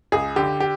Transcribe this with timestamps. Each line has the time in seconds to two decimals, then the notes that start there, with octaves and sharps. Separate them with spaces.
0.12 C#2 G#4
0.36 D3 G4
0.60 G4